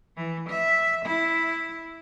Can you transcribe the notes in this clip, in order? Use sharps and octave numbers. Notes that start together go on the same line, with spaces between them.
E3
E5
E4